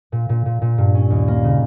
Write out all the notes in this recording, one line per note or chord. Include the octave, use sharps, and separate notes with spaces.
A#2
A#2
A#2
A#2
G2
C#4
D#2
A#3
C#3